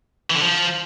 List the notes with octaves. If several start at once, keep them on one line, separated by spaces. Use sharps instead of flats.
E3
D3
F3